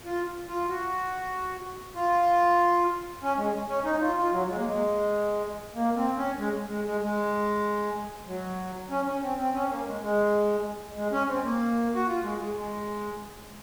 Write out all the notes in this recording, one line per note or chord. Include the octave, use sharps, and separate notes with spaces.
F4
F4
F#4
F4
C#4
G#3
C#4
D#4
F4
F4
F#3
G#3
A#3
G#3
A#3
C4
C#4
G#3
G#3
G#3
G#3
F#3
C#4
C#4
C4
C4
C#4
A#3
G#3
G#3
G#3
C#4
C4
A#3
F#4
F4
G#3
G#3
G#3